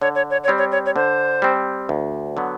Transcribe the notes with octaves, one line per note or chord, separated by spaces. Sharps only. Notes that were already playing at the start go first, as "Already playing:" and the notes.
D3 C#5
C#5
C#5
C#5
G3 C4
C#5
C#5
C#5
D3 C5
G3 C4
D2
D3 F#3 B3